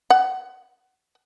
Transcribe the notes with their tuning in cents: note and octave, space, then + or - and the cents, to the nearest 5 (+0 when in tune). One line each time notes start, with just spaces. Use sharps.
F#5 +30